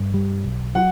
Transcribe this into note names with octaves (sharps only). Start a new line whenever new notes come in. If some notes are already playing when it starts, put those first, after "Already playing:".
Already playing: G2
G3
B1
F#3 F#5